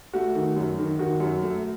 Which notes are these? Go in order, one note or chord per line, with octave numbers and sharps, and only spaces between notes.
A3 F#4
D#3
F#2
D#3
D#3 F#4
F#2
A3